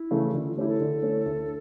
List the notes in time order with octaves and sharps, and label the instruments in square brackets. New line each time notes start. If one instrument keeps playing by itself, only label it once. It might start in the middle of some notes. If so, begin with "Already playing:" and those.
Already playing: [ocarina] E4
[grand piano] C#3 E3 A3
[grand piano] D3 [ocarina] F4
[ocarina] F4
[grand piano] A3 C#4 E4 [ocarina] G4
[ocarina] A4
[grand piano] D3
A3 C#4 E4
D2